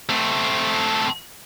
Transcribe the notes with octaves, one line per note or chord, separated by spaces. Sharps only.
A3 C4